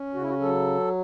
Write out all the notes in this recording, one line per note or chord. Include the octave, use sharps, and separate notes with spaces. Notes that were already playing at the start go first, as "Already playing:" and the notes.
Already playing: C#4
C#3 F#4
E4
F#4
F#3 A4